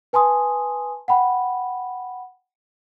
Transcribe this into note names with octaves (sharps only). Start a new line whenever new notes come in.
B4 G#5 A5 C6 D#6
F#5 G5 B5